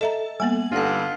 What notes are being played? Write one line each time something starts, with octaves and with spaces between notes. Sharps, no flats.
A4 D#5 E5 A#5
G3 A#3 B3 G#5 F#7
G2 D3 D#4 F4 F#5